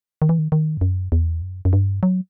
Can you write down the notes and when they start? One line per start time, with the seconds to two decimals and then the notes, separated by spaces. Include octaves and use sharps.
0.22 D#3
0.29 E3
0.39 D#3
0.52 D#3
0.77 G2
0.81 F#2
1.12 E2
1.42 F#2
1.65 F#2
1.73 G2
2.03 F#3